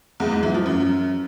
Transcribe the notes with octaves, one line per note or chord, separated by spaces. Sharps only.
E2
G#2
E3
F3
F#2